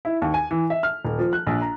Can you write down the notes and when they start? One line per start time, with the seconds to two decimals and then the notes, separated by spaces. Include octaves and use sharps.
0.05 E4
0.22 D#2
0.34 G#5
0.51 E3
0.70 E5
0.83 F6
1.05 D#1
1.19 F3
1.33 F#6
1.47 A#1
1.61 A#5